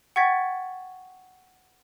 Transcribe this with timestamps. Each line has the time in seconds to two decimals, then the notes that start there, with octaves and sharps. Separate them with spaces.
0.16 F#5 G5 C#6 G#6 A6 B6